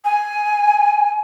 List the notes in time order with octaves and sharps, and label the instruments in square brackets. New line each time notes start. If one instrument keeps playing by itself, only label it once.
[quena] G#5